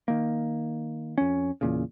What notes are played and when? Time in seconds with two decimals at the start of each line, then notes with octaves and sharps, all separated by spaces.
0.08 D#3 A#3
1.18 F2 C#4
1.61 E2 A#2 C#3